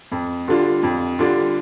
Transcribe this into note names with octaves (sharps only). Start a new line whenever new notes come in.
F2
D3 G3 D4 F4
F2
D3 G3 D4 F4